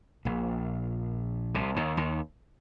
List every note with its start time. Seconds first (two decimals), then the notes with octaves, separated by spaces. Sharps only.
0.25 A#1 A#2
1.55 C2 C3
1.76 D#2 D#3
1.97 D#2 D#3